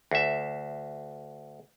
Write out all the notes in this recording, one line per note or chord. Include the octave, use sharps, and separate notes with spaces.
D2 E5